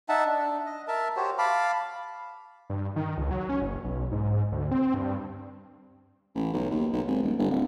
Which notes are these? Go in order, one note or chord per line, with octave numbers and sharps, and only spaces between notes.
D#4 E5 F#5 A5
D4
D#5
A#4 E5 A5
F#4 G4 C5 C#5
F5 A5 B5 D6
G2
D#3
C#2
F#3
C#4
F#1
B1
G#2
D2
C4
G2
A1
B1
D#2
B1
G#1
D#1
G1
D1